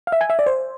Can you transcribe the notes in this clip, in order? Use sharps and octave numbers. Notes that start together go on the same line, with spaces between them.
F5
E5
G#5
E5
D5
C5